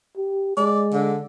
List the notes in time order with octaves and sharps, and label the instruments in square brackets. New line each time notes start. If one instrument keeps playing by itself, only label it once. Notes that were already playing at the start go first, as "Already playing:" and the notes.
[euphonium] G4
[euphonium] G#3 [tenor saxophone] D5
[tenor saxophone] D3